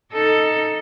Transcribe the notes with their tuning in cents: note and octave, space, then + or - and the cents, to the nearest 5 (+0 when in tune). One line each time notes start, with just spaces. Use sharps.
D#4 +0 A4 +10